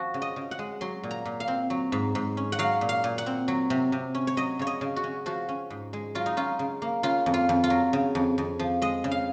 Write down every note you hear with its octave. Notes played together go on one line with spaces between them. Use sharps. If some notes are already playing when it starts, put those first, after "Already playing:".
Already playing: F3 F#4
C#3
D#5
C#3
F#5
G#3
F#3 C6
A#2
A#5
A#2
F5
C4
F#3
G#2
G#2
C#4
F#5
F#3 F5
A#2
F5
A#2
F#5
C4
F#3
C3
C3
C#4
C#5
F#3 D#5
C#3 C#5
D#5
C#3
F#4
C#4
F3 F#4
C#4
G#2
G#3
F#3 F4
D#4
C#4 F4
C#3
A#3
C#3 F4
F2
F4
F2
F4
F#3
C#3
F2
F2
F3
G#3 D#5
C#3
F5